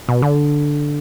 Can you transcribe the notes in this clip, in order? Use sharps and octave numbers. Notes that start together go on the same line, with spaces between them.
B2
D3